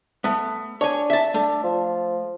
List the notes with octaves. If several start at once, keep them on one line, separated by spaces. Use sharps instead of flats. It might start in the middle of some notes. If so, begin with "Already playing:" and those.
A3 B3
D4 C#5 G#5
E5 A5
A3 D4
F3